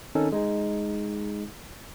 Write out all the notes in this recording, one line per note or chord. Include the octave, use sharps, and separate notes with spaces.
D#3 C4 C#4 D#4 A4
G#3 D#4 G#4